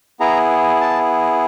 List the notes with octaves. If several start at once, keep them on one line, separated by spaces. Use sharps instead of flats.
B3 E4 G#4 A#5
A5